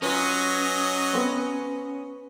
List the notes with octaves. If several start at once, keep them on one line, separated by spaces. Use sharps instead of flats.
F#3 C#4 F4 B4 D#5
B3 C4